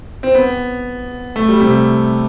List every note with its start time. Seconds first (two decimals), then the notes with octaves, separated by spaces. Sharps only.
0.23 C4
0.34 B3
1.36 A3
1.48 G3
1.60 C3